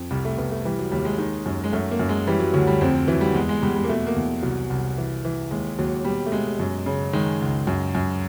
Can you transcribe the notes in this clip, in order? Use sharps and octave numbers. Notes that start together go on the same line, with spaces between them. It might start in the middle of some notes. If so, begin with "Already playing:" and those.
Already playing: F2
C2 G3
A3
C2 B3
A3
E3 G3
F#3
D#2 G3
G#3
D#3
F#2
G#3
F#2 A3
A#3
F#2
G#3
E3 G3
F#3
D2 F#3
G3
F2 C4
C4
E3 F#3
G3
E2 G#3
G#3
E2 G3
G3
A#3
B2 A3
A#3
E2
C2 F#3
C2
E3
E3
D#2 G#3
D#2 F#3
B2 G3
A3
B2 G#3
F#2
C#3
D#3 G#3
C#2
F#2
F#2